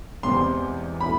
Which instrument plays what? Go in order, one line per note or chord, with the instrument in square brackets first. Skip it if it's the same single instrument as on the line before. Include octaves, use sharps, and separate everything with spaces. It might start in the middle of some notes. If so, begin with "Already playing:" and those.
[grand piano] E1 E2 C3 G3 C4 [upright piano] C6
[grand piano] B2 A3 E4 [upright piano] B5